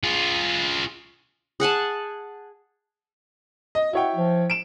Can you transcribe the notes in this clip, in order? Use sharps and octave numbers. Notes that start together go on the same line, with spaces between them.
F4 G#4
G#4 F#5 G#5 A5
D#5
E4 F#4 C#5 G5
F3
D7 E7